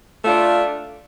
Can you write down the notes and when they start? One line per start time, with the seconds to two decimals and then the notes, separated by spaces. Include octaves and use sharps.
0.23 A3
0.26 F4
0.29 D4